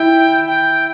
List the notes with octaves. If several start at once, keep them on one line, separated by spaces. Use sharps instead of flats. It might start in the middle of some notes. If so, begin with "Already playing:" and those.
Already playing: E4 G5
G5